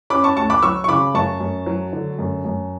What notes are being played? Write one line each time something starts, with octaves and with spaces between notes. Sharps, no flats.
C#4 B5 D6
A5 C#6
D2 A5 C#6
B5 D6
F#3 C#6 E6
C#6
C#3 B5 D6
F#2 A5 C#6
F#2
F#3
D3
F#2
F#2